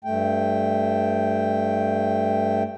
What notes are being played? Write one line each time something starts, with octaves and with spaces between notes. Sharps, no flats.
G2 A3 G5